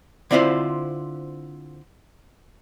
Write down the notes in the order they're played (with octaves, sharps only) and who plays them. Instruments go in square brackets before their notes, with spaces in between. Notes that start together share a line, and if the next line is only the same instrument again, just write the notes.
[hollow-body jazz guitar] D3 C4 E4 F4 C5